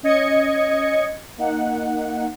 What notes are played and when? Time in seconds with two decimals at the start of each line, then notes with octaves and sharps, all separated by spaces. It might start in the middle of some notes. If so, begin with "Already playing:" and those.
0.03 C#4 D#5 G#6 C#7
1.37 A#3 D#4 F#5